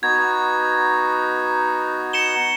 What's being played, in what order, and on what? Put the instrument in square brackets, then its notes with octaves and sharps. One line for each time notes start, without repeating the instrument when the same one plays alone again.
[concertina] B3 D#4 F#4 [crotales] G#6
[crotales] C#7 E7 G7